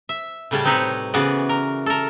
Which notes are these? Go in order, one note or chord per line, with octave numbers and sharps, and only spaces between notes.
E5
A2 C#3 G3 C#4 A5
C3 C4 D#4 B4 C#5
C#3 E3 B3 F#4 D5
A#4
A4 A#4